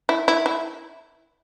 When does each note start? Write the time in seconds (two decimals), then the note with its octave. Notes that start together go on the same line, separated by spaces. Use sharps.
0.09 E4
0.28 E4
0.46 E4